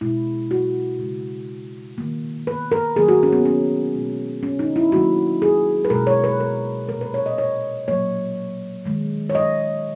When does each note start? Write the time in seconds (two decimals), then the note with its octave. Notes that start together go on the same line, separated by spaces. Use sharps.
0.01 B2 G#3 E4
0.51 F#4
0.99 C#3 G#3
1.98 D#3 A#3
2.47 B4
2.72 A#4
2.96 D#3 F#3 A#3 G#4
3.08 F#4
3.23 C#4
3.33 B3
3.45 C#4
3.95 B2 G#3
4.43 C#4
4.59 D#4
4.76 E4
4.92 D#3 F#3 A#3 F#4
5.42 G#4
5.85 B4
5.90 B2 G#3 A#4
6.07 C#5
6.24 B4
6.40 A#4
6.88 A#2 A#3 A#4
7.01 B4
7.14 C#5
7.26 D#5
7.38 C#5
7.88 A#2 F#3 A#3 C#5
8.85 D#3 G#3
9.30 C#5
9.35 D#5